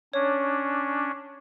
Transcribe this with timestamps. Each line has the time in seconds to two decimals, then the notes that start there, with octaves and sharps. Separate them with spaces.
0.13 C#4 D4 C#5